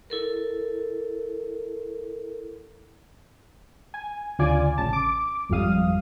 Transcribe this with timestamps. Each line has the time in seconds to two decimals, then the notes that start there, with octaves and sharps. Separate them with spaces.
0.10 E4 A4 A#4
3.94 G#5
4.39 D2 C#3 F4 D5 G#5 D6
4.78 A1 C#3 A5
4.93 D6
5.49 G#1 F2 F3 G3 F5 D#6